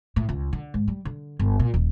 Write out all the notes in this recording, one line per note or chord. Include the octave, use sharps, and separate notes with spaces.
A2
C#2
D3
G#2
G3
D3
G1
A#2
D#1